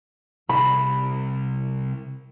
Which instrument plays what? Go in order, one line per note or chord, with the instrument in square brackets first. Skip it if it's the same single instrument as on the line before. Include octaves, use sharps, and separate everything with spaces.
[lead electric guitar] C2 [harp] B5